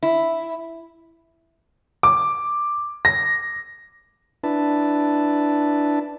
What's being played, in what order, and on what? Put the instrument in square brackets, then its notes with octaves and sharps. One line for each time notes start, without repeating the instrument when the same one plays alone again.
[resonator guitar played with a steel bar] E4
[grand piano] D6
A#6
[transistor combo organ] D4 E4 B4 A5